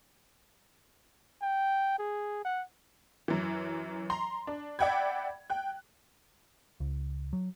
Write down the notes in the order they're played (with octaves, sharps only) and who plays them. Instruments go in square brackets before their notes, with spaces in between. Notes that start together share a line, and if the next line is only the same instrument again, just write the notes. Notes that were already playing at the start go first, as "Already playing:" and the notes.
[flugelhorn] G5
G#4
F#5
[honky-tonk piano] F#2 E3
A#5 C6
D4
D5 E5 F#5 G5 B5 G#6
G5 F#6
[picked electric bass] C#2
F#3